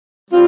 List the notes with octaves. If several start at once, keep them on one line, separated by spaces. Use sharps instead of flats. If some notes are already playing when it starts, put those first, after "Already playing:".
G3 C4 F4